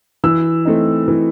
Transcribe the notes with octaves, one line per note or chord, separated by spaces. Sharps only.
E3 E6
A3 C4 D#4
E3